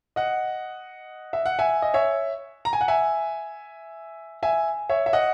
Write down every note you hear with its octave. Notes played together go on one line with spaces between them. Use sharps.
D#5 F#5
E5
F#5
E5 G#5
D#5
C#5 E5
A#5
G#5
F#5
E5 G#5
E5 G#5
C#5 E5
E5
D#5 F#5